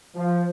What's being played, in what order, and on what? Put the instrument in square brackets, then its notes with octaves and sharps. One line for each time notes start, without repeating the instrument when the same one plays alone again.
[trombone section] F3